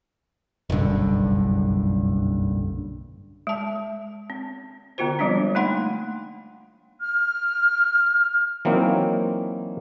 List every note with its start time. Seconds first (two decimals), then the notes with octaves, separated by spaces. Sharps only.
0.70 F#1 B1 G2 D3
3.47 G#3 A5
4.30 C4
4.98 D3 B3 F4 F#4 C5
5.19 F3 G3 G#3 C4 D4
5.55 A3 A#3 D#4 F#5 C6
7.00 F6
8.65 E3 F#3 A#3 C4 D#4